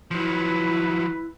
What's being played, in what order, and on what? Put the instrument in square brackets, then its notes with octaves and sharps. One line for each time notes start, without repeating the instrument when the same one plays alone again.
[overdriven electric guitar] F3 F#3 [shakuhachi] E4 [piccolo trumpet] B4